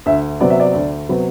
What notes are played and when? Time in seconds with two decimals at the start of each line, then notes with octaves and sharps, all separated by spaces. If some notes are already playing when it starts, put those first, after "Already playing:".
0.06 D2 E5
0.40 C3 F#3 B3 D5
0.50 E5
0.60 D5
0.74 D2
1.09 C3 F#3 B3